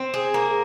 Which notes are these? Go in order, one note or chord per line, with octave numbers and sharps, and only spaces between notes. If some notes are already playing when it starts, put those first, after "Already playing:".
Already playing: C4
G#4
A#3